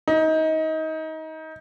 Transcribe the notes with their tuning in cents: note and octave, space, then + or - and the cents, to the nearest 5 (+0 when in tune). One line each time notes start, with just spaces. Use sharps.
D#4 +25